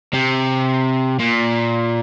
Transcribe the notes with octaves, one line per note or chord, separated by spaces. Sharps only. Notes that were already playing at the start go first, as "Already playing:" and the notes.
C3
A#2